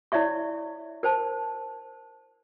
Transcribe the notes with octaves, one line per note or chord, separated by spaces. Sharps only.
E4 C#5 D5 E5 C#6
A#4 C5 A5